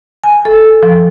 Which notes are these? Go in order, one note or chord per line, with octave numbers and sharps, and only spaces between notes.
G#5
A4
F3